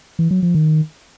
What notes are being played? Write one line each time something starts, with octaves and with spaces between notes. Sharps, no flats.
E3
F#3
F3
D#3